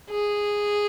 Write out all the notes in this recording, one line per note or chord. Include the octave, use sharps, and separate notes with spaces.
G#4